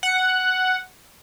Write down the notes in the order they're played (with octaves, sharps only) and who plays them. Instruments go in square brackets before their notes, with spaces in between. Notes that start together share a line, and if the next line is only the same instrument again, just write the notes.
[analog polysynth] F#5